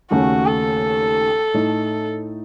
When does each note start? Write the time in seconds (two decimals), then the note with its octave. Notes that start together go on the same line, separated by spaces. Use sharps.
0.11 D#2 C#3 A3 C#4 F#4
0.46 A4
1.54 A2 A3 D#4